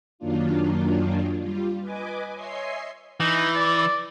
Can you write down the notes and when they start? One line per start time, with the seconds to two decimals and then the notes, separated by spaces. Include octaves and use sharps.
0.19 F#2 D#3 F#3 A#3 D4 F4
1.39 G3 F4
1.80 B4 D#5 G#5 D6
2.34 C#5 D#5 E5 G#5 C6 C7
3.20 E3 D#4
3.55 D5